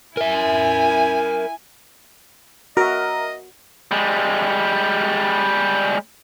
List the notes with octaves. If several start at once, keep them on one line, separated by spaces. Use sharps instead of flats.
E4 A#4 E5 G#5
F#4 A#4 D#5 E5
G3 G#3